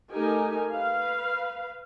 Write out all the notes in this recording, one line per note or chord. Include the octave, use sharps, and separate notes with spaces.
A3 D#4 G4 A#4 G#5
B4 F5